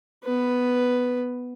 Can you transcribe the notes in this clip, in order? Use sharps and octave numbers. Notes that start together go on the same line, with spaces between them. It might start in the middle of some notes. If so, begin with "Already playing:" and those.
B3 B4